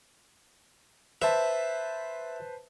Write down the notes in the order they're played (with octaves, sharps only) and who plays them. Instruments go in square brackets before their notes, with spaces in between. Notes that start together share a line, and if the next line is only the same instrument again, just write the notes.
[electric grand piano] B4 C5 A5 [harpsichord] E5